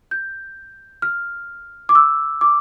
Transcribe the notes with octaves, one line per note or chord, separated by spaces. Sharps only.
G6
F6
D6
E6
D6